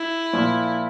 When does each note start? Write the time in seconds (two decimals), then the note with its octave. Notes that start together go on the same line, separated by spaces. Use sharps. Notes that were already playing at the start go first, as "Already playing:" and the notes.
Already playing: E4
0.33 A#2 F3